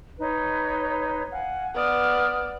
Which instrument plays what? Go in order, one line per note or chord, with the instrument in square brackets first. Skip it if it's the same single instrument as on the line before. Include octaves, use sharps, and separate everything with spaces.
[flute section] D#4 B4 C#5
F5 F#5 G#5
[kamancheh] B3 D5 [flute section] D#6 F6